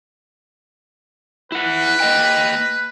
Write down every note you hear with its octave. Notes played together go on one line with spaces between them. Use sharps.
E4 B4 F#5
A#3 D#5 G5